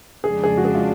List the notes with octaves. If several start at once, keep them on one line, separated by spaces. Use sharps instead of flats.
F2 C#3 G#3 D4 G#4
G#4
F#4
G#4
F4